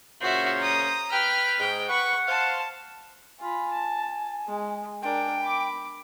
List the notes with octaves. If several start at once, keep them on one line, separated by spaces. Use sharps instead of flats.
A#2 C#3 C#4 F#4 C5 E5
A#5 D#6
B4 G5 F6
G#2 G5
B4 F#5 C#6
C5 F5 A5
F4 G#5 B5
A5
G#3
D4 A#4 G5
B5 D6